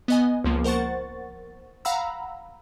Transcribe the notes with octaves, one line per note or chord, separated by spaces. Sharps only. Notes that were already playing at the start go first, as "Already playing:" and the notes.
B3 D#5 G#5
C#2 F3 A#3
A#4 C5 F#5 C#6 A6
F5 F#5 A#5 B5 E6